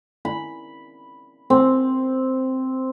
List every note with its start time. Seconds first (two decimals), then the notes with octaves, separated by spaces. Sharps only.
0.25 B5
1.50 C4